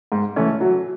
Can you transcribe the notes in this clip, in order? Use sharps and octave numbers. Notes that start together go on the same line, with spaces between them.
G#2
E3 A3 C#4
F#3